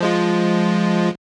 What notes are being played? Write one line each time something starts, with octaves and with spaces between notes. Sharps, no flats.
F3 G#3 F4